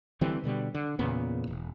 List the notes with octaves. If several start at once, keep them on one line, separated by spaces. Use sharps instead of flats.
D3 E3 G3 C4
B2 D3 G3
D3
E2 A#2 C#3 B3
E1